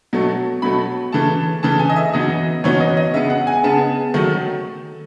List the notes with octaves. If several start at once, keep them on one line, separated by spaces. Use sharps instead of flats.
B2 F#3 A3
B2 F#3 A3 B5
C#3 E3 A3 A5
C#3 E3 A3 A5
G#5
D#5
E5
F#2 E3 B3 D#4 D#5
F#2 E3 B3 D#4 C#5
D#5
D#5
C#3 G#3 B3 E5
F#5
G#5
C#3 G#3 B3 A5
D#3 F#3 A3 D#4